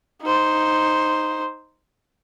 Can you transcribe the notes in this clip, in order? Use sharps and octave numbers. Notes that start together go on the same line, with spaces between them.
D#4 C5